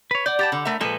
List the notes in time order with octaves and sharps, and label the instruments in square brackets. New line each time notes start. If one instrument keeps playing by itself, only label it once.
[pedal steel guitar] B4 C#5
[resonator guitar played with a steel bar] D5 [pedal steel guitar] F#5 D6 G6
[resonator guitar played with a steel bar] G4 G5 A5
D3
A3 A#4 E5
[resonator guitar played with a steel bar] A#2 F3 A4 [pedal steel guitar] G#3 B4